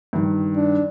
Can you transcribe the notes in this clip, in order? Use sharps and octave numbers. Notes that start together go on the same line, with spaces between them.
G2 D#3
D4